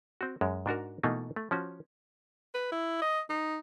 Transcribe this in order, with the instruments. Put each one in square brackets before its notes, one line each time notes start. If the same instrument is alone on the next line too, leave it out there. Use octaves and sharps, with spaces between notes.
[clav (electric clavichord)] C4 F#4
F#2 G#3
G#2 D4 F#4 A#4
B2 E3 A3 A#3 D#4 F4
A3
F3 C#4 F#4
[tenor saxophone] B4
E4
D#5
D#4